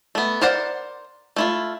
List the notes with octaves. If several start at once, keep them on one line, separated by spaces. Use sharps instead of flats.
A3 B3
A#4 C5 D5 F#5
A3 E4 F4